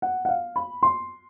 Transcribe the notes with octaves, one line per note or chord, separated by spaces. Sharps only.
F#5
F#5
F5
B5
C6